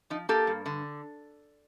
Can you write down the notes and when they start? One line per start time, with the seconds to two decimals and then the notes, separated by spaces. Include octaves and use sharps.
0.10 F3 D#4
0.29 A#3 G4 A4
0.47 G2
0.66 D3